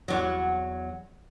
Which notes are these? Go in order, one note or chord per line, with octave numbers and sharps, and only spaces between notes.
E2 F#3